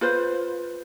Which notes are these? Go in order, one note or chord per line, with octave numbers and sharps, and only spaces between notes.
F4 B4 C5